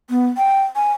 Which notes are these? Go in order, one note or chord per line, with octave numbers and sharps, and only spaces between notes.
B3
G5
G#5